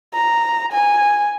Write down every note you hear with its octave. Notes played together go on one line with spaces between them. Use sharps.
A#5
G#5